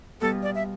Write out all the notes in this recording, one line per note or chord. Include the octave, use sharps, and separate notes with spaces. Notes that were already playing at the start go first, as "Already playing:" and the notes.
B2 G3 B3 F4 A4
D5
E5